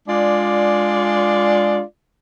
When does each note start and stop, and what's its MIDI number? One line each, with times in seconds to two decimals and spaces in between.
0.08 1.81 56
0.08 1.81 62
0.08 1.81 65
0.08 1.81 74